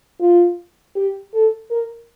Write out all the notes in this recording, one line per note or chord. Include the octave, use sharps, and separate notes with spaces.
F4
G4
A4
A#4